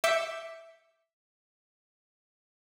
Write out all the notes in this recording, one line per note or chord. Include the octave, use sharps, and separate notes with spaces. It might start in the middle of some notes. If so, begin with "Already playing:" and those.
E5 D6 G6 C#7